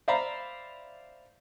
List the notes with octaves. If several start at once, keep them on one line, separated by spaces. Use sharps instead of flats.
C5 D5 E5 F5 A#5 B5